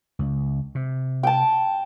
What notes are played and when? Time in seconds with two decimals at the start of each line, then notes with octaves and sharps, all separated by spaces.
0.19 C#2
0.75 C3
1.23 G5 A5